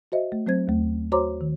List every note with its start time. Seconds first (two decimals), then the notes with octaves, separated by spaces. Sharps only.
0.12 F#4 C5 D#5 E5
0.32 A3
0.47 F#3 C4 C5 G#6
0.67 D#2 A3
1.12 F#4 C5 C#5 A#5 C6 D6
1.41 D#3